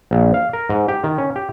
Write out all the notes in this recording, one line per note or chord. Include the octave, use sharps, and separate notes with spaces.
A#1
F5
A#4
G#2
G4
D#3
C#4
G4